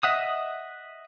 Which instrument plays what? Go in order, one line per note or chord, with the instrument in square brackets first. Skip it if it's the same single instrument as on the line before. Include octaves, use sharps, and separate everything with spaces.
[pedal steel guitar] D#5 E5 F#5 D#6